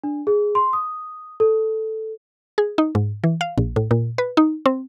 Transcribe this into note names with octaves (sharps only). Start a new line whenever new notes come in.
D4
G#4
C6
D#6
A4
G#4
D#4
G#2
E3
F5
A#1
A2
A#2
B4
D#4
C4